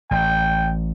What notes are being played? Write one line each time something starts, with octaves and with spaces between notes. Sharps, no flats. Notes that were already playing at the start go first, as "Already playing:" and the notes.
A1 G5